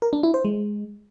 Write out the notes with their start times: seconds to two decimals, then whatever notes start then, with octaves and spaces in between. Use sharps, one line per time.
0.02 A#4
0.13 D4
0.23 E4
0.34 C5
0.45 G#3